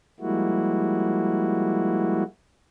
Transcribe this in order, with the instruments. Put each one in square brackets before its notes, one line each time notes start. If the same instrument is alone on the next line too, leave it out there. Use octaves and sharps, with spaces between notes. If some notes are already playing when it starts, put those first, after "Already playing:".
[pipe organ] F3 G3 G#3 A#3 E4 F#4